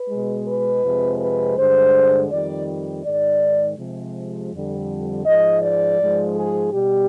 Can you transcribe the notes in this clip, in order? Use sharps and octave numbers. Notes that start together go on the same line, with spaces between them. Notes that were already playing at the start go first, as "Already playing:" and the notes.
Already playing: B4
B2 G#3
B4
F2 C3 F3 G#3
B4
G2 D3 G#3 C5
F2 D#3 G3 D5
G#2 D#3 G#3 D5
C3 F3 G#3
F2 D3 G3
G#2 F3 G#3 D#5
D5
G#2 F3 G#3
G#4
B2 G3 G4